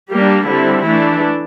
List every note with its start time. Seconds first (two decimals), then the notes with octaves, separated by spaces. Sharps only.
0.11 G3 A#3 D4 G4
0.48 D3 G3 C4 E4
0.85 E3 A3 D4 E4